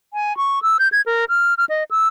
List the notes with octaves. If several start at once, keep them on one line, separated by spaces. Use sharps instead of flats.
G#5
C#6
E6
G6
G#6
A#4
F6
F6
D#5
E6